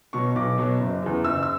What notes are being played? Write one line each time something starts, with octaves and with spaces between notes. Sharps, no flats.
B2 F#3 C#6
B1 D6
B2 F#3
F#1
E2 C#3
F#1 E6
E6